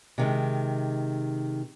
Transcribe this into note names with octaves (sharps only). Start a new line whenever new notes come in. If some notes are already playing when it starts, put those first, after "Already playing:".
C3 D#3 G#3